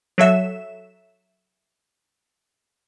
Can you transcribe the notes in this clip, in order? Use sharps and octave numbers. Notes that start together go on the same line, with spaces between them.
F#3 A4 E5 E7